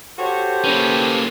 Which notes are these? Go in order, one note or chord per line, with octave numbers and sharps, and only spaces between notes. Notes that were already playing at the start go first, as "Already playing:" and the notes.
F#4 G4 A4 C5 C#5
A#3 C#4 B4